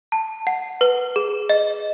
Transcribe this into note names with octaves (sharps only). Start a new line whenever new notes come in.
A5
F#5
B4
G#4
D#5